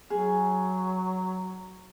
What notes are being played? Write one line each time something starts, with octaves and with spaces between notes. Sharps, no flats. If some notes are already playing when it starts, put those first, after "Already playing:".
F#3 C#4 G#4